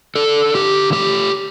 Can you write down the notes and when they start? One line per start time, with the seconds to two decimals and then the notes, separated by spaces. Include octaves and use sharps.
0.16 D4 A4
0.54 D3 G4
0.92 A3 G4